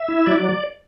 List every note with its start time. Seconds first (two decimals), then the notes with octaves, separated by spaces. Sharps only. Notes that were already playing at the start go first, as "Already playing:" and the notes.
Already playing: E5
0.08 E4
0.26 F#3 D5